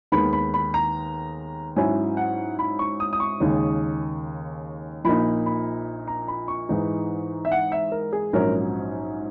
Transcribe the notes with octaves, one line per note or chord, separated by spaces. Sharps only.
D#2 D#3 G#3 B3 B5
B5
B5
A#5
G#2 F#3 C#4 E4 G#5
F#5
B5
C#6
D#6
D#6
C#6
D#2 C#3 G#3 D#4
A#1 A#2 A#3 D#4 B5
B5
A#5
B5
C#6
G#2 E3 G#3 D#4
E5
F#5
E5
A#4
G#4
A#1 G#2 F#3 C#4 A#4